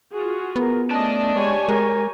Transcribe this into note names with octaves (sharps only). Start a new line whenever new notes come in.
F4 F#4 G#4
B3 A#4
A3 C#4 D5 D#5 A5
G#3 G4 C#5 G#5
G#3 A#4